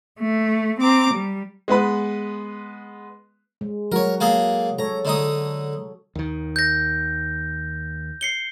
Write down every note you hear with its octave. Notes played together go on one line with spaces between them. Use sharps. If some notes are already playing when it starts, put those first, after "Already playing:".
A3
C4 A#5 D6
G3
G#3 B3 B4 B5
G#3
F#3 F#4 A#4 C#5
A#3 G#4 A4
A4 C#5 A#5
D3 D#4 D#6
D#2 D#3
G6 A#6
C7 C#7 G7